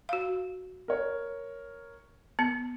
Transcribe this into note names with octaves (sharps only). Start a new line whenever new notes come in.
F#4 F5
A#4 C#5
B3 C#7